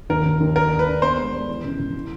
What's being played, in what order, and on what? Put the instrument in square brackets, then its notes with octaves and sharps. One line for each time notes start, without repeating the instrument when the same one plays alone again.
[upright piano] D#2 [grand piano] A#4
[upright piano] D#2
D#2
[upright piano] D4 [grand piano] A#4
[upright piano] D4
[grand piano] B4
[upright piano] D4
[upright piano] B3 [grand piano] C5
[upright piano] G#3
G#3
E3
C#2
C#2
E4